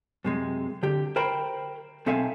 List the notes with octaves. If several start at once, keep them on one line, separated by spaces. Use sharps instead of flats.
F#2 C3 G#3
D3 G4
A#4 C5 G5 B5
B1 C4 A4 E5 F5 G#5